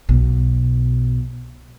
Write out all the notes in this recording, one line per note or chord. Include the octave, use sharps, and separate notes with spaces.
B1 B2